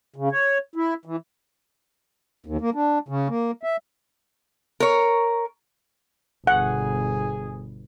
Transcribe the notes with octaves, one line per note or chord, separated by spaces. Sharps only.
C#3
C#5
E4
E3
D#2
A#3
D4
C#3
A#3
E5
A#4 C#5
G1 B2 G#4 F#5